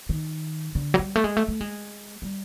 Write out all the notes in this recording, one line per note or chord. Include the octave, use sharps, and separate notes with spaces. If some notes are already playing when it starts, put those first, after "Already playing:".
D#3
D3
F#3
G3
A3
G#3
A3
A3
G#3
G3